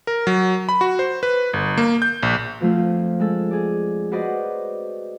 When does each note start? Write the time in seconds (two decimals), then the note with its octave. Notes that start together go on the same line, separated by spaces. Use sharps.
0.07 A#4
0.27 F#3
0.69 B5
0.81 F#4
0.99 C5
1.23 B4
1.53 G1
1.78 A#3
2.02 G6
2.23 A#1
2.60 F2 F3 A3 F4
3.20 G#3 A4
3.51 G#4 D5
4.12 F#4 B4 C5 D5 D#5